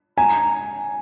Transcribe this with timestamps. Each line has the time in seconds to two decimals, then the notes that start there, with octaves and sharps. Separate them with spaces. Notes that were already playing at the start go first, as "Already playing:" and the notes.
0.18 G#5 A#5